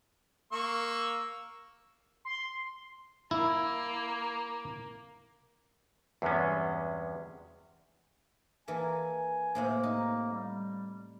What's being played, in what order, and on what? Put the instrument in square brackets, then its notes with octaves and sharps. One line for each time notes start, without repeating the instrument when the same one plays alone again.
[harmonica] A#3 C#6 E6
[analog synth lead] C6
[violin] A#3 [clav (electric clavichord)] E4
[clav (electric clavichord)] E2 G2 C3 G#3 B3 C#4
[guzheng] E3 A#3 A4 [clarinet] G#5
[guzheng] A2 C3 C4 [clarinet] A#3
[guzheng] D#4
[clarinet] G3